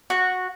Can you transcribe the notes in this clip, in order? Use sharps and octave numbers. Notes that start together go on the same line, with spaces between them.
F#4